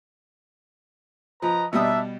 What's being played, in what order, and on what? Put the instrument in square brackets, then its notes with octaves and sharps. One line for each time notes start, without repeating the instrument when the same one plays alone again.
[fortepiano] F3 [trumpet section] B4 D#5 A#5
[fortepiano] B2 G3 D#6 [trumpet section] D4 D#4 E5